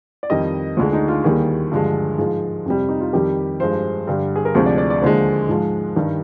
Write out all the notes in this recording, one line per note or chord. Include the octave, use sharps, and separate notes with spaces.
D5
F2 D#3 G3 D#5
D2 D3 G#3 F4
D#4
F4
D#2 D#3 G3 G#4
G2 D3 F3 G#3
G#2 F3 G#3 G#4
F2 C3 G3
D#4
F4
F2 D#3 G3 G4
G2 F3 G#3 C5
G2 D3 G3
G#4
A#4
D2 C3 F3 G#3 C5
D5
D5
D5
D#2 D3 F3 G#3 C5
G#2 F3 G#3
G2 D#3 G3 D5